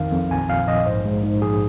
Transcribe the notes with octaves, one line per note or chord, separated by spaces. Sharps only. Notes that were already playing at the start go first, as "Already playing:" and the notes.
Already playing: A#1 F2 D#3 F5
F2
A#1 G#5
A#2 F5
A#1 D#5
G#2 C5
G#3
G#2
A#1 G#4